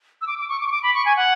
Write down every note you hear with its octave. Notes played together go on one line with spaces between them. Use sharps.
E6
D6
D6
C#6
D6
C#6
D6
B5
C#6
G#5
F#5